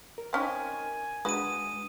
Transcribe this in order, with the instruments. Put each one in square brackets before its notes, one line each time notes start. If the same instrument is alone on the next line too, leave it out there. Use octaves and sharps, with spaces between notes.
[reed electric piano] A#4
[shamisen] C4 C#4 D#4 [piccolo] G#5
[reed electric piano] G#3 D4 [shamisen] F#4 B4 [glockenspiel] D#6 D#7